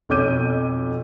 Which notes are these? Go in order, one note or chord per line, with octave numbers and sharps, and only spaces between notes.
B1 F2 C#5 D6 G6 D#7